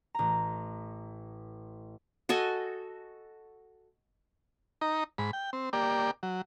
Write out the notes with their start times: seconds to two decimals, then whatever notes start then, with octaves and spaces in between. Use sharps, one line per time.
0.15 A1 A#5
2.29 F#4 A4 D#5 G#5
4.81 D#4 A#5
5.18 G#2 B5
5.33 G5
5.53 C4
5.73 A#3 G4 D5
6.23 F#3